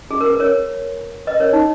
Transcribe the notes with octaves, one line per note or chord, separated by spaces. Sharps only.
G#4
A#4
B4
A#4 C#5
B4 D#5
A#4 C#5
D#4